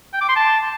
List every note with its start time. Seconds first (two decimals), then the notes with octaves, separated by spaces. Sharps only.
0.13 G5
0.21 D6
0.29 C6
0.36 A5